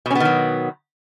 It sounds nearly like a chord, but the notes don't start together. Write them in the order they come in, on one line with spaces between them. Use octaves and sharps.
B2 C#4 B3 D#3 F#3